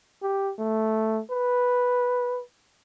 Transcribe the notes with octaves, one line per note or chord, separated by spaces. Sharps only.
G4
A3
B4